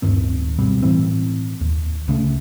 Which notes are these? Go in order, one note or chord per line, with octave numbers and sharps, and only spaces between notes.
D1 G2 D#3 C4
B2 G3 C4
A2 E3 C4
D#2
C#2 C#3 A3